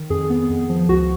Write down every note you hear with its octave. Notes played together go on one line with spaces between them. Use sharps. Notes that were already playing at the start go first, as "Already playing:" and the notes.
Already playing: D#3
F2 G#4
B3
F2
F3
C#2 F#4